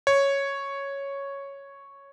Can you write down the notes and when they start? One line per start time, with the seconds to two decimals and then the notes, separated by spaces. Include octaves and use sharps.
0.07 C#5